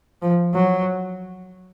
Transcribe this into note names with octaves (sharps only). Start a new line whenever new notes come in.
F3
F#3